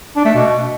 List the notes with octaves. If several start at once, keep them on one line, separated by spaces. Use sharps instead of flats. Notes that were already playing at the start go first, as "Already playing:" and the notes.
D4
A3
B2